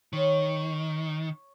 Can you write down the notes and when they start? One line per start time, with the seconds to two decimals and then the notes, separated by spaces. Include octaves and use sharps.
0.13 D#3 C#5